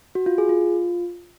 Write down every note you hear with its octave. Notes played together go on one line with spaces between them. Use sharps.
F#4
F4
G#4
F4